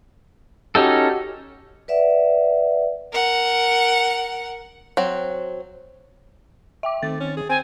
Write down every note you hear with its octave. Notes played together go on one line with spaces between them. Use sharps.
C#4 D#4 F#4 G4 A4
B4 D5 E5 F#5
A#4 F#5
F#3 C4
E5 G5 D6
D#3 A3 C4 A6
C#4
G#4
C4 G#5